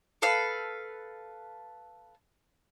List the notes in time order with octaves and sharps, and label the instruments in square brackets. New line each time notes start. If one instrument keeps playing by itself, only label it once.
[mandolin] A4 B4 F5